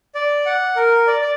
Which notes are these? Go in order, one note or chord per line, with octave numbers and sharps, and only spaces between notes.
D5
F#5
A#4
D5
D5